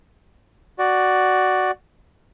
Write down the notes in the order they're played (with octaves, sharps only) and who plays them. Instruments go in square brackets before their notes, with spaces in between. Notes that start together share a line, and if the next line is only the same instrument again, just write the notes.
[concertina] F#4 D5